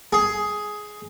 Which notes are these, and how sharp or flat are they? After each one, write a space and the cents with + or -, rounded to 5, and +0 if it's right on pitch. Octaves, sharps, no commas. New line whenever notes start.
G#4 +10